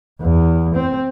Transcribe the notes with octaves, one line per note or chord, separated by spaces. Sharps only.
E2
C4